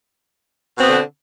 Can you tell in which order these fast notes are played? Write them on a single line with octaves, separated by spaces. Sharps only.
B2 C4 B3 D3